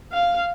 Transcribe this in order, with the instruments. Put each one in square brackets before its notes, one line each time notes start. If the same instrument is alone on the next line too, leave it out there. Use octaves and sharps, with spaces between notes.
[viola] F5